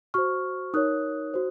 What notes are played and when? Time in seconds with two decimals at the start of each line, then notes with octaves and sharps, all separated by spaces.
0.14 F#4 C5 C#6 F6
0.74 D#4 A#4 C#5 D#6 F#6
1.34 F#4 C5